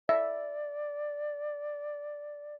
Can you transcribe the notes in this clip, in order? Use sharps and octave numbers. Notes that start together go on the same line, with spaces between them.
D5 E5